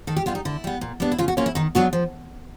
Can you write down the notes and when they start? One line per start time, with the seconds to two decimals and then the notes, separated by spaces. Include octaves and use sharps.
0.07 D#3 A4
0.16 G4
0.26 G3 B3 F4
0.35 D#4
0.45 D3 E4
0.64 G3 B3
0.81 A#2
1.00 G3 B3 D4
1.12 E4
1.18 C#3 F4
1.28 F#4
1.37 F#3 A#3 C#4 F4
1.46 E4
1.55 D#3 D#4
1.75 F#3 B3 D4 F#4
1.93 F3